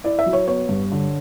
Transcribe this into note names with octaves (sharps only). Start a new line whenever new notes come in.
E4 D5
E5
F#3
C#5
B3 C#5
G2
D3